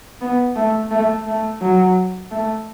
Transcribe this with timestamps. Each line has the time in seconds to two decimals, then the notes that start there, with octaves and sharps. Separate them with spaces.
0.21 B3
0.56 A3
0.91 A3
1.26 A3
1.61 F#3
2.31 A3